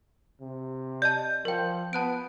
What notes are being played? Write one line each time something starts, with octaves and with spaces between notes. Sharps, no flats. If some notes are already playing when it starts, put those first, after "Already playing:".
C3
D5 D#5 A5 G6
F3 A#4 G5
B3 A5 F#6 D7